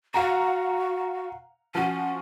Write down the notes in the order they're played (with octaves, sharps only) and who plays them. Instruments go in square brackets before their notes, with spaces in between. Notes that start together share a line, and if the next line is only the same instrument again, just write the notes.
[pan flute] F#4 [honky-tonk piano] F5 F#5 A#5
[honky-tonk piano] F3 F#4 [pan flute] C#4